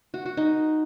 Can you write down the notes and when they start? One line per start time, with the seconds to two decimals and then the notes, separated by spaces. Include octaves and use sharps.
0.14 F#4
0.26 F#4
0.37 D#4